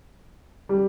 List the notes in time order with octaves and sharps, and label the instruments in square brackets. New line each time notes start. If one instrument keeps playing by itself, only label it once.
[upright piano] G3